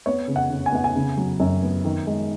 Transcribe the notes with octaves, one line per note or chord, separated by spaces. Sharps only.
B3 C#5
C#3
F#5
C#3
G#5
B3 F#5
G#5
C#3
F#3
F#2
B3
D#3
G#3